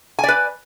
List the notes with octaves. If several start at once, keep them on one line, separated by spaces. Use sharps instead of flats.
B4 D5 G#5